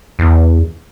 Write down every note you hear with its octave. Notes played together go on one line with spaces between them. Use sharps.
E2